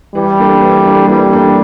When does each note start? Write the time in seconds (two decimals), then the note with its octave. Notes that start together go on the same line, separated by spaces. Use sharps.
0.15 E3 G3
0.38 A#3 D4 A4
0.62 E3
0.85 A#3 D4 A4
1.09 E3 G3
1.32 A#3 D4 A4